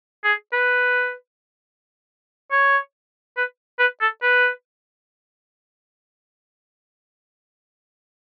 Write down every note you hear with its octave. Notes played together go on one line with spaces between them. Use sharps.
G#4
B4
C#5
B4
B4
A4
B4